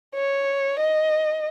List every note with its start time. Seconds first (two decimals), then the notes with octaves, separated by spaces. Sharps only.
0.15 C#5
0.79 D#5